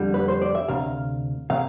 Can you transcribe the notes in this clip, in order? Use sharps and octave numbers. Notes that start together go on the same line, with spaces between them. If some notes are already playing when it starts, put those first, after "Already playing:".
Already playing: F2 D3 G3
B4
C5
D5
E5
D2 C3 F5
C3 F5